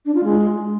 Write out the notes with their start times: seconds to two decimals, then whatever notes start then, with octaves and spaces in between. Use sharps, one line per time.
0.05 D4
0.15 F4
0.24 G#3